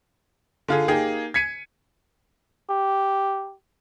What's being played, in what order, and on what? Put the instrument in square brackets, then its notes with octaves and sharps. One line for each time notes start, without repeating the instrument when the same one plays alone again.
[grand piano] D3 F4 G#4
A#3 D#4 G4 G#4
G#6 B6 C#7 D#7
[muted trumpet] G4